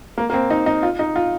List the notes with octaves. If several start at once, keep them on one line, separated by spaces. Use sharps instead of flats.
A#3
A#3
C4
D#4
D#4
F4
D#4
F4